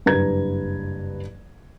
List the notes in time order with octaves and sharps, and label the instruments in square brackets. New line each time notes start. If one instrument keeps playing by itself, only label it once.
[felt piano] F#1 G2 B4 A#5 G#6